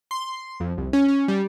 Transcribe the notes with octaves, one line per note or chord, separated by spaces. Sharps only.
C6
F2
C2
C#4
C#4
G3